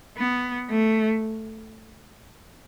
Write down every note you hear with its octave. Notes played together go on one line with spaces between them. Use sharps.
B3
A3